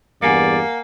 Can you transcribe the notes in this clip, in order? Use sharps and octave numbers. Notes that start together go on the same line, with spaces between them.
E2 G2 A#3 D5 F#5 G#5 C#7